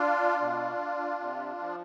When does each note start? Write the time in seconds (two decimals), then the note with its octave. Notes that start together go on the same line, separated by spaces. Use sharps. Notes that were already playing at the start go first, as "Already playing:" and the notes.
Already playing: D4 F4
0.41 B2
1.21 C3
1.60 F3